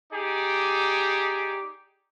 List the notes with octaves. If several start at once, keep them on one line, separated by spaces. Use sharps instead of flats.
D#4 G4 G#4 D5